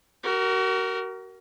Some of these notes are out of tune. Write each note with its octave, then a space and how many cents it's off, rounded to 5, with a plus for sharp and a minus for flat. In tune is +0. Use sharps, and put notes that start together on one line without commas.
F#4 +35 A#4 +0